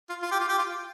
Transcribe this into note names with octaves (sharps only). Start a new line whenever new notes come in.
F4
F4
G4
F4
G4
F4